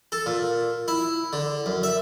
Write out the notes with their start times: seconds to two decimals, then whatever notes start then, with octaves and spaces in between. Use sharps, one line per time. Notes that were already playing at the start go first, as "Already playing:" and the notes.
0.12 A4
0.26 A#2
0.88 E4
1.33 D3
1.66 F#2
1.83 E5